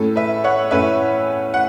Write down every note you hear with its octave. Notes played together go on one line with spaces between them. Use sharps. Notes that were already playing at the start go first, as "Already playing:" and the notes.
Already playing: A2 A3 C#4 A4
B4 E5
C#5 F#5
A2 A3 C#4 B4 E5
F#5